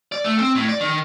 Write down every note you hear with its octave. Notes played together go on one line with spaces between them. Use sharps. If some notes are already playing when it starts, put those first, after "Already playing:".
D5
A3
C4
A2
D5
D#3